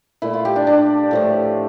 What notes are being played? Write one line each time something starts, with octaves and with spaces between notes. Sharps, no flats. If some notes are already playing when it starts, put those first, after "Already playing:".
A#2 A3 E4
F4
G4
D4
D4
A2 F3 A3